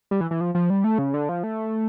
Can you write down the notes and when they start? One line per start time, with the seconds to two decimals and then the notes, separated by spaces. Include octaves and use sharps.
0.11 G3
0.21 E3
0.31 E3
0.41 F3
0.55 F3
0.70 G3
0.84 A3
0.98 C#3
1.14 D3
1.29 F3
1.44 A3